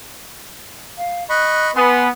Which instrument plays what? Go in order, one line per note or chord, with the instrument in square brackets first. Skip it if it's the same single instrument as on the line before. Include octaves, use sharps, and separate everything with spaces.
[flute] F5
[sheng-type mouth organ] D#5 B5 C#6 [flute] F#6
[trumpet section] B3 [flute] G#5 [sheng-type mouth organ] C6